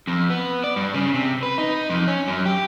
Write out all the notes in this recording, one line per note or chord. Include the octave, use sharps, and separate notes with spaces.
F2
B3
D5
G2
C#3
C3
B4
D#4
F2
C#4
F#2
G4